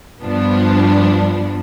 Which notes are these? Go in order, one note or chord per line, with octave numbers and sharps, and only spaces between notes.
G2 F3 B3 D4